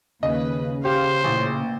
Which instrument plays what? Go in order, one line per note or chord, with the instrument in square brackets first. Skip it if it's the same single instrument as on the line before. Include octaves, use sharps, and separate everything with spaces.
[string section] D#2 B4 [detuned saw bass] C#3 [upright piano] D#5
[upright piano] G4 [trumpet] C5 [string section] F5
[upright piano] A1 [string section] A#2